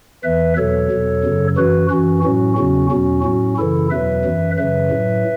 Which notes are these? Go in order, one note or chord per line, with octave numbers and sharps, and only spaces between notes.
E2 E3 B4 E5
E2 B2 F#3 A4 C#5
E2 B2 F#3
F#2 C#3 F#3
F#2 E3 F#4 B4
F#2 E3 C#4 F#4
A2 F#3 C#4 F#4
E2 C#3 F#3 C#4 F#4
E2 B2 F#3 C#4 F#4
A2 F#3 C#4 F#4
F#2 C#3 E3 E4 A4
E2 B2 F#3 B4 E5
F#2 E3
F#2 C#3 F#3 B4 E5
A2 F#3